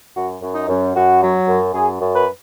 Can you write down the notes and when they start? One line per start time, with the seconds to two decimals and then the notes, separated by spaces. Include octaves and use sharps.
0.15 F#2 F#4
0.42 F#2
0.55 D#4
0.68 F#2
0.95 F#2 F#4
1.21 F#3
1.48 F#2
1.74 F#2 G#4
2.01 F#2
2.14 B4